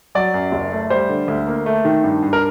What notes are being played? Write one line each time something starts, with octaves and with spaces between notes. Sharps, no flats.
F#3 D5
F#2
F#1
A3
G3 C5
D3
D2
A#3
A3
D#3
G2
G2
A#4